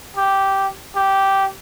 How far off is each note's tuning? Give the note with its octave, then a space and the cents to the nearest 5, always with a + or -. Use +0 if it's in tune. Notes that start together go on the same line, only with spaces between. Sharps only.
G4 -10
G4 -10